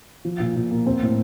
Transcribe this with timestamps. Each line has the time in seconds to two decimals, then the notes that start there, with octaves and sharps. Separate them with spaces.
0.25 F3
0.40 A#2
0.56 A#2
0.71 A#3
0.86 C4
1.02 A2